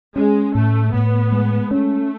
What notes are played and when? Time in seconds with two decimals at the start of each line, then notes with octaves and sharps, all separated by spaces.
0.15 G#3 C#4
0.55 A2 A3
0.93 A2 B3
1.32 G#3
1.71 A3 C#4